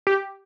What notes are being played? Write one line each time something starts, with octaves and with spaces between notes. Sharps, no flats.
G4